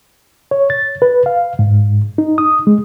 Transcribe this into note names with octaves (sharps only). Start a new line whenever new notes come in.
C#5
A6
B4
F5
G#2
D#4
D#6
G#3